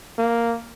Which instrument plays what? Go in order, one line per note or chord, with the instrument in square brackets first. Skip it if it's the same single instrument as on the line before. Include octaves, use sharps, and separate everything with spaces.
[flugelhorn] A#3